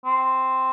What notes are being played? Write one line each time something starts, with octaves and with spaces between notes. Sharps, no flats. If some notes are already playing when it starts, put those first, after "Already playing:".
C4